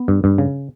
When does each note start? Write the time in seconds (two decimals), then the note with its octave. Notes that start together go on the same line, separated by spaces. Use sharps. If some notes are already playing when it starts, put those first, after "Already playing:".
Already playing: B3
0.08 G2
0.24 G2
0.38 C#3